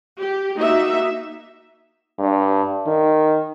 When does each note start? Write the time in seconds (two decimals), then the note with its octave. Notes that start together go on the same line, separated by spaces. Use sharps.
0.20 G4
0.58 A#3 D#4 F#4 E5
2.19 G2
2.87 D#3